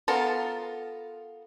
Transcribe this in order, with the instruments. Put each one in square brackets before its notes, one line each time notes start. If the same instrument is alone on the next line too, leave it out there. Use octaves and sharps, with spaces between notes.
[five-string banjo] B3 F4 A4 A#4